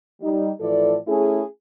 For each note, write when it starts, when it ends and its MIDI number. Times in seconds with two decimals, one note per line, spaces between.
0.22 0.51 55
0.22 0.51 63
0.61 0.97 45
0.61 0.97 52
0.61 0.97 53
0.61 0.97 69
0.61 0.97 74
1.07 1.42 57
1.07 1.42 61
1.07 1.42 64
1.07 1.42 68